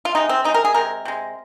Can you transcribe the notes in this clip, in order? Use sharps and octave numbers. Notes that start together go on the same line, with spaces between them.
F4
C3 G#3 D#4
C4
C3 G#3 D#4
A#4
G#4
C3 G#3 A#4
C3 G#3